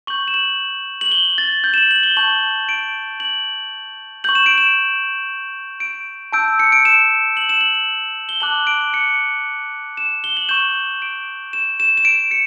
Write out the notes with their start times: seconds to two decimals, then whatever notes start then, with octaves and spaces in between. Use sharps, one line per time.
0.07 C#6 G6 F#7
0.28 E7
0.34 F#7
1.01 F#7
1.12 G7
1.38 A6
1.64 G6
1.74 E7
1.78 F#7
1.91 F#7
2.03 G7
2.17 A5 C#6 G6 F#7
2.69 D7
3.20 F#7
4.24 C#6 G6 F#7
4.35 E7
4.46 D7
4.58 E7
5.80 D7
6.32 A5 E6 G6 D7
6.59 C#7
6.72 D7
6.85 E7
7.37 F#7
7.49 E7
7.61 F#7
8.29 G7
8.40 A5 D6 F#6 F#7
8.67 D7
8.94 C#7
9.97 E7
10.24 G7
10.37 F#7
10.49 C#6 G6 E7
11.02 D7
11.53 E7
11.80 E7
11.97 E7
12.05 D7
12.31 C#7